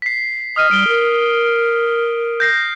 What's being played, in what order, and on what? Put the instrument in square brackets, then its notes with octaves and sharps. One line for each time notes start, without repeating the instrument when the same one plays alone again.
[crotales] B6 C7
[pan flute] D#5 [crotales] D#6 F6 D#7
[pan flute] G3 [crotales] D7 G7
[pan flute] A#4
[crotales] G6 A#6 C7